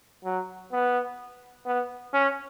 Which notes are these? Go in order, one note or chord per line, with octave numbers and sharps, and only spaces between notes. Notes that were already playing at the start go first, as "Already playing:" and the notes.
F#3
B3
B3
C#4